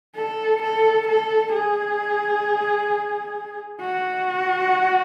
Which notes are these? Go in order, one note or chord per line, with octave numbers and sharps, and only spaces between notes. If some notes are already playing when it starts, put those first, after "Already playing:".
A4
A4
A4
G#4
F#4